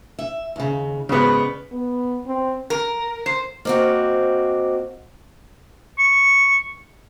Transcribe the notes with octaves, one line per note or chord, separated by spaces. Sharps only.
E5
D#2 C#3
G#2 C#3 B3 D5
B3
C4
A#4
C5
A#3 C4 F#4 C5 D#5 D6
C#6